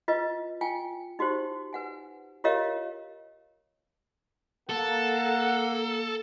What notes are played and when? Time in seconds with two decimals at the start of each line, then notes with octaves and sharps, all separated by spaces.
0.08 F4 B4 D#5
0.61 F4 G5 G#5
1.19 D#4 F#4 G4 C5
1.73 B4 F#5 G#5
2.44 F4 G4 A#4 C#5 D#5 F5
4.69 A#3 A4 F#5